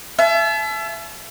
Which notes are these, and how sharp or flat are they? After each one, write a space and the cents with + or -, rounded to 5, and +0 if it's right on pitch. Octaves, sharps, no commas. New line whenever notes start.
E5 +30 A5 -40